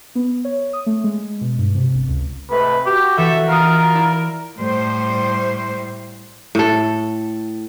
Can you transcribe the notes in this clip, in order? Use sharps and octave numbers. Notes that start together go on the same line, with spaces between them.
B3
C#5
D#6
A3
G#3
B2
G2
C3
G1
C#2
G#2 C3 A3 B4
F#4 G4
E3 A4 E5
F4 A#4 D#6 F6 C7
E4 D5
A2 G3 C5
A2 A4